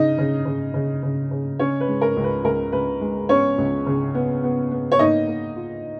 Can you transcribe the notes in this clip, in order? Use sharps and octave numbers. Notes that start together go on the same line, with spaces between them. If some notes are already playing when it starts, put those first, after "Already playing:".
Already playing: C#3 D#4 D#5
C#3
C#3
C#3
C#3
C#3
C#3 C#4 C#5
B4
G#3
A#4
C#2
B4
C#2 A#4
C#2 B4
G#3
B3 C#4 C#5
C#2
C#3
B3
B3
B3
C#5
A#3 D#4 D#5
A#3
F4